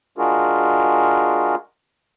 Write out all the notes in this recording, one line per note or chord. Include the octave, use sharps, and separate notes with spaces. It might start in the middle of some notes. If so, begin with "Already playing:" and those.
G#3 D4 F4 F#4 G#4 A#4